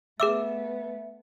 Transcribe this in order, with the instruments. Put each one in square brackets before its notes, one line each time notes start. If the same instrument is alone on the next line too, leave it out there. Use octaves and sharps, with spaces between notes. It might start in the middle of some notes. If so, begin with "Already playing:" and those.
[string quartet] A3 B3 [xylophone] G#4 D6 E6 [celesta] E5